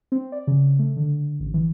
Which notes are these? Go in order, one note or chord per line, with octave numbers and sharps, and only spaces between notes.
C4
D5
C#3
A3
D3
A1
E3